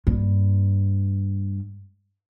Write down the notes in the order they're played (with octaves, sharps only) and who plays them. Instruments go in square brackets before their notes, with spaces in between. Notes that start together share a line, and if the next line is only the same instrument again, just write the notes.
[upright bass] G2 A#3